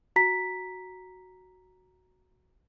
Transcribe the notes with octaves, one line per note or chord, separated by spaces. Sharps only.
F#4 A#5 B6